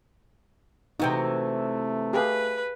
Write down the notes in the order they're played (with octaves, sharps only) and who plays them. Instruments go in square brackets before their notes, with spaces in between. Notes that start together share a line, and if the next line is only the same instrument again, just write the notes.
[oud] C3 E3 F#4 [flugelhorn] A3 [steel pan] D#4 G5
[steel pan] G4 G#4 F5 [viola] B4